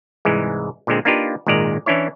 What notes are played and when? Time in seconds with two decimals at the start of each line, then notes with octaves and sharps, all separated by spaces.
0.25 C2 G#2 E3 G#3
0.87 A#2 D3 G#3 C4
1.05 A#3 D4 D#4 F4 G4 B4
1.47 G#1 A#2 D#3 G#3 D5 A#5
1.86 E3 C#4 D4 E4 C#5